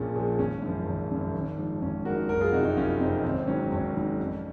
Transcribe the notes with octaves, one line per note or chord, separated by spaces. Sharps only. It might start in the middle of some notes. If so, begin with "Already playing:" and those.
Already playing: A#1 A#2 F3 G#3 C#4
A#2 F3 G#3
G#1 C#4
F#2 C#3 F3
G#1
F#2 C#3 F3
G#1
G#2 F3
G#1 C#4
G#2 F3 F#4 A#4
F#1 F#4 A#4
F4 G#4
F2 C3 D#4 F#4
D#4 F#4
F#1 C#4 F4
F2 C3 C4 D#4
G#1 C4
G#2 F#3 C#4
G#1 C#4
G#2 F#3
F2